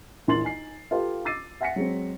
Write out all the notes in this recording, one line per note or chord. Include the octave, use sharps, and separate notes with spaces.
A#1 E3 A#4 C6 A6 F#7
D#4 G#5 C7
F4 G4 A4 B4 F5
D6 E6 A6 C7 D#7
E5 F#5 G#5 A#6 B6 C#7
F#3 G#3 C4